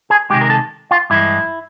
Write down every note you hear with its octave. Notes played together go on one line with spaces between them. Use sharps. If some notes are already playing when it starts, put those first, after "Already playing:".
G#4
C3 D#3 G#3 G4
A#4
A4
F4
G2 E3 G#3 E4